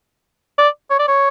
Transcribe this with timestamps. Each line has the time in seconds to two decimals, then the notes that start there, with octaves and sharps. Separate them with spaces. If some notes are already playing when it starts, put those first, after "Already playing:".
0.58 D5
0.90 C#5
0.99 D5
1.08 C#5